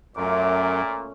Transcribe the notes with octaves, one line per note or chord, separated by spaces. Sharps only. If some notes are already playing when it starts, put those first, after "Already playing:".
F#2 A#2 A3 C#4 D6